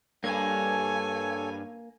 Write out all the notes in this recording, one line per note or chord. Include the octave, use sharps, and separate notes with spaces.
G2 A#3 A4 C#5 G#5